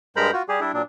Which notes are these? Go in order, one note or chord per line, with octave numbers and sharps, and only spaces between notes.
G2 G#3 A#4 C5 A#5 B5
F4 F#4
G3 G4 G#4
G3 D4 E4
A#2 F#3 D4